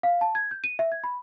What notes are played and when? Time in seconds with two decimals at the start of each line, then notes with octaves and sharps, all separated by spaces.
0.03 F5
0.21 A5
0.35 G#6
0.51 G6
0.64 D#7
0.79 E5
0.92 G#6
1.04 B5